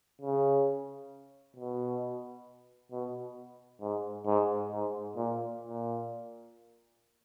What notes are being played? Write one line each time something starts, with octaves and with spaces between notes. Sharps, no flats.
C#3
B2
B2
G#2
G#2
G#2
A#2
A#2